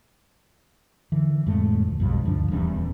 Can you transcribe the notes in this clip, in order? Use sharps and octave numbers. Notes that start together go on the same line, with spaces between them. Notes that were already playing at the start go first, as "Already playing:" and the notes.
D3 E3
F2 A2 G#3 A3
D2
B1 F2 G#2 G3
D2 G2 F3 D4
D#1 E2 G3 C#4